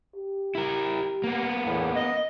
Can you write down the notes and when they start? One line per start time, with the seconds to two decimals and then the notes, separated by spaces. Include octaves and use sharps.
0.16 G4
0.55 E4 A#4
1.24 A#3 B3
1.65 E2 A2
1.95 D#5